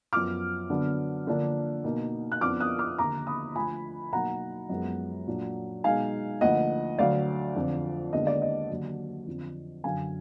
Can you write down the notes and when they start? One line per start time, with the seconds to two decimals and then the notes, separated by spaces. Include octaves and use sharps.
0.13 F#2 F3 B3 D6 F6
0.70 D3 F#3 B3 D4
1.27 D3 F3 A#3 D4
1.84 B2 A#3 D#4
2.32 F#6
2.41 F2 F3 B3 D4 D6 F6
2.60 D#6 F#6
2.79 D6 F6
2.98 D#2 D3 F3 A#5 D6
3.27 B5 D#6
3.55 D2 D3 F3 G#5 B5
4.12 B2 F#3 A#3 D#4 F#5 A#5
4.69 F#2 F3 G#3 B3
5.27 A#2 F#3 D4
5.84 B2 G#3 D#4 F5 G#5
6.41 D2 D3 F3 A#3 D#5 F#5
6.98 D2 D3 F#3 D5 F5
7.55 F2 D3 F3
8.13 D#2 D3 G#3 B3 D4 D#5
8.27 D5
8.42 D#5
8.70 D#2 D3 F#3
9.27 F2 D3 F3
9.84 F#2 D3 F#3 F5 G#5